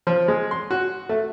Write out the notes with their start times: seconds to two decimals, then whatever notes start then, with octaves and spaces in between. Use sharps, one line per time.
0.07 F3
0.28 G#3
0.51 C6
0.71 F#4
1.09 A3